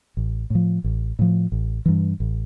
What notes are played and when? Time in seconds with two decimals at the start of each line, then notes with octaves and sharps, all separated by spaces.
0.17 A1
0.50 A2 F3
0.84 A1
1.19 A2 F3
1.52 A1
1.86 G2 E3
2.20 A1